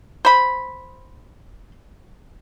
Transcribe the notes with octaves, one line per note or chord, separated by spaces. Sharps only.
C5 B5